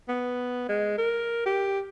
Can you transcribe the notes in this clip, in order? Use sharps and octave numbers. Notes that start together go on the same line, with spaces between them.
B3
G#3
A#4
G4